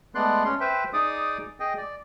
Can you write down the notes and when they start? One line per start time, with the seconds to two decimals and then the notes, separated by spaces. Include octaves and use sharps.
0.15 G#3 A3 B3 D5 C6 F#6
0.45 C#4 C6
0.61 B4 C5 E5 G5
0.93 D#4 G#4 D5 D6 D#6
1.60 G#4 D#5 G5
1.77 D5